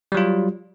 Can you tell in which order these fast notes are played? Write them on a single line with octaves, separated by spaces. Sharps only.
G3 F#3 F4